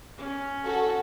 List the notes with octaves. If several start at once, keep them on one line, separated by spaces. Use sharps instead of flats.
C#4
F#4 A4